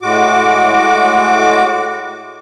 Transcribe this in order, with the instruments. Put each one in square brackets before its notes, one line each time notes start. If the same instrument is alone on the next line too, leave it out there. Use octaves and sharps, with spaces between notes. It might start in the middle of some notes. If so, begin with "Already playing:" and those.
[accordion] A2 G#3 F#4 D6